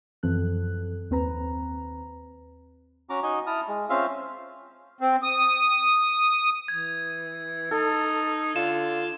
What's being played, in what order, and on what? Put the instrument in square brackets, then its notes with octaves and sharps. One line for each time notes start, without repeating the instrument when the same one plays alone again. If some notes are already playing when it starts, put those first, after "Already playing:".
[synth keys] F#2 E3 F3 C4 A4 F#6
D#2 C4 B4 A#5
[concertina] C#4 F#4 A#5 D6
D#4 F#4 D#5 G#5
E4 A5 D#6 F6
G#3
C4 C#4 F4 E5 F5
[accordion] C4
D#6
[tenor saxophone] E3 [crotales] G#6
[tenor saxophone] D#4 [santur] A4
[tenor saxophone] D3 [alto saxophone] F4 [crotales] E7